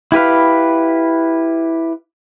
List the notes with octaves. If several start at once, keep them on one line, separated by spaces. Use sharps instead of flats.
E4 G4 B4 F5